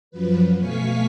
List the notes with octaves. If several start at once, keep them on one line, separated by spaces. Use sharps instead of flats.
F#2 F3 F#3 B4
B2 A3 F5 G#5 C#6 B6